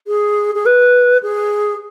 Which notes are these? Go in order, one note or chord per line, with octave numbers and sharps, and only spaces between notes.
G#4
G#4
B4
G#4